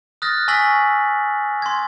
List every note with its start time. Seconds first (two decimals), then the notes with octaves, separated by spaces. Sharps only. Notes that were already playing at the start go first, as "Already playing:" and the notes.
0.22 D#6 F6 F#6 A6 A#6
0.48 G#5 C#6 E6 A#6 B6 F#7
1.62 C6 G#6